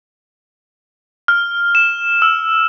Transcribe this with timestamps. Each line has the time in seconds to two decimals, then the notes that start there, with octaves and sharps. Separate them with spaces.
1.28 F6
1.75 E7
2.22 E6